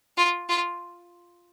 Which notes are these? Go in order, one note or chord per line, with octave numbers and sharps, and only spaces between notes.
F4
F4